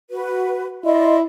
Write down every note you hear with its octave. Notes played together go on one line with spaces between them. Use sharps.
F#4 B4
E4 D5 D#5 C6